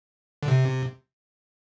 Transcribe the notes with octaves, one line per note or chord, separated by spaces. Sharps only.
D3
C3